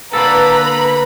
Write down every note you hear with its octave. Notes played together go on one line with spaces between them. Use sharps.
D3 A#3 A4 B4 A#5 B5